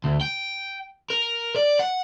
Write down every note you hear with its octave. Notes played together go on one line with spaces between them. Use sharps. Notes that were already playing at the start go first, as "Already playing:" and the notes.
D2
G5
A#4
D5
F#5